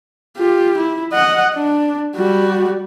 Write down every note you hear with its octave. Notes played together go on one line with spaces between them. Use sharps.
F4 G4
E4
D#5 F#5
D4
G3 F#4